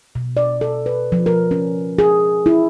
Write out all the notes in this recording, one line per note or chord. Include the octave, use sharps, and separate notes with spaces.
B2
D5
A4
B4
F3
A#4
C#4
G#4
E4